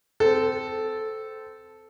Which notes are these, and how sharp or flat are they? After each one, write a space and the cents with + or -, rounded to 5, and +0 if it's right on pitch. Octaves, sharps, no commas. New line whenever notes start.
C4 -20 A4 -10